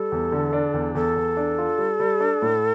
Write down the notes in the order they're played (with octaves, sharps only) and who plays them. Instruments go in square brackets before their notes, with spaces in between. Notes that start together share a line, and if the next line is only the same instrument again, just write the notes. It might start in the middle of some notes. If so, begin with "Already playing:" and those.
Already playing: [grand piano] G3 [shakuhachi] A4
[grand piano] E2
D3
D4
E2
[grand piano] E2 [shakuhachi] A4
[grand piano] E2
D4
F4
G3
G3
D4
A2